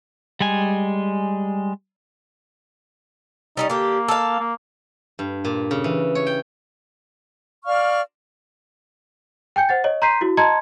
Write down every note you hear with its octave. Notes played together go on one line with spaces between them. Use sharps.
G3 G#3 G#5
G3 B3 C#4 D#4
D3 A#3 G4
A4 F5
A#3
G2
A#2
C#3
E3
C#5
G5
D5 F5 C#6 F6
G5 G#5 G6 C#7
C5 F#5 A6
C#5 D#5
A#5 C6 G6 B6 C7 D#7
E4 F#4
D#5 A5 A#5 C6 G#6 C#7